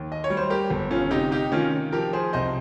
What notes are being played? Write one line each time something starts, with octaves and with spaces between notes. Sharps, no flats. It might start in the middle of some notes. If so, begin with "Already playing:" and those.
Already playing: D#2
D#5
C#5
G3
C5
G4 A#4
G1
C#4 F4
C3 D#4 G4
D#4 G4
D#3 C#4 F4
F3 G4 A#4
G#4 C5
C2 C5 D#5